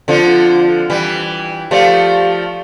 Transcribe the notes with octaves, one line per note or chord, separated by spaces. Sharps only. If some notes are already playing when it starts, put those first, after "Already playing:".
D3 F3 C4 F4 A4
E3 G3
F3 A3 G4 D5 F5